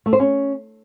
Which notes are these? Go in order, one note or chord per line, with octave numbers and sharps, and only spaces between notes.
A3
C5
C#4